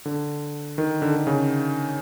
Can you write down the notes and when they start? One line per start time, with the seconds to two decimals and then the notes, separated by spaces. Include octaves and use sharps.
0.05 D3
0.78 D#3
1.02 D3
1.16 D3
1.27 C#3